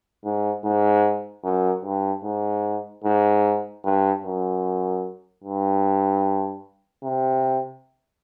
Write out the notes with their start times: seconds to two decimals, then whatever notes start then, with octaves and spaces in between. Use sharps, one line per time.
0.25 G#2
0.64 G#2
1.44 F#2
1.84 G2
2.24 G#2
3.04 G#2
3.84 G2
4.24 F#2
5.44 G2
7.04 C3